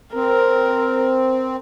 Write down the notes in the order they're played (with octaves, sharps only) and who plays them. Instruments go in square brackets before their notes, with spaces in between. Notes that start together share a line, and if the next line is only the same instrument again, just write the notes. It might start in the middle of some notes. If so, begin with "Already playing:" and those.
[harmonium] C4 [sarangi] A#4